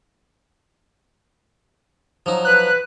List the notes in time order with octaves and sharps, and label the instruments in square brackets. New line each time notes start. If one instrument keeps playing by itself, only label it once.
[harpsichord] F3 F#3 D#4
[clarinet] B4 [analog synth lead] F#6